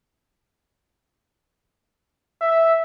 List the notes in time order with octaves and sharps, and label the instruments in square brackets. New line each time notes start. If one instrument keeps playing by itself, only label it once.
[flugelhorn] E5